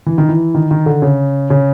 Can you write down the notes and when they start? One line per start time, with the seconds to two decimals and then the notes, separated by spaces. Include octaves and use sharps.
0.06 E3
0.18 D#3
0.29 E3
0.54 D#3
0.71 D#3
0.86 D3
1.02 C#3
1.50 C#3